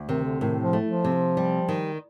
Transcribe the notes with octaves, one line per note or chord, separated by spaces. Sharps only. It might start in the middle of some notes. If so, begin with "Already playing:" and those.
Already playing: D2
C3 D#3
D3
A2 D#3
F3
A3
F3
C3
G3
D#3